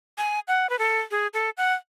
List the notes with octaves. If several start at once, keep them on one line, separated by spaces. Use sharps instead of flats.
G#5
F#5
B4
A4
G#4
A4
F#5